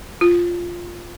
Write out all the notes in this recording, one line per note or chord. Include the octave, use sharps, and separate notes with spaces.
F4